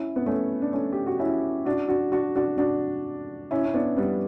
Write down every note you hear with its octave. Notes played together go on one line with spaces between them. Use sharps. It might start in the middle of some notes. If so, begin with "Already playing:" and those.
Already playing: C#4 E4
B3
A3 C#4
D4
A3 C#4
G4
F#4
C#4 E4
D4 F#4
D4 F#4
D4 F#4
D4 F#4
D4 F#4
C#4 E4
C#4
B3 D4
G3 B3